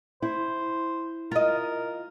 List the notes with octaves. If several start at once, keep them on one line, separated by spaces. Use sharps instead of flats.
E4 C5
F4 A#4 D#5